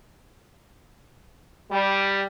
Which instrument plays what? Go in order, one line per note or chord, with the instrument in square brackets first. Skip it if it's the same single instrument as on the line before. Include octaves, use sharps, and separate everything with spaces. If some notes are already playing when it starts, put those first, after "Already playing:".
[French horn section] G3